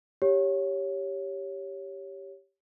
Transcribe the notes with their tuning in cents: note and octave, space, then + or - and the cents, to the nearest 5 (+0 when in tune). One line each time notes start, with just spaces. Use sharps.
G4 +0 C#5 +0